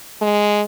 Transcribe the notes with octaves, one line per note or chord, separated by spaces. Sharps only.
G#3